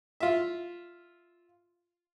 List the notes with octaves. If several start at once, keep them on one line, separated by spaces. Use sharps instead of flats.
F4 E5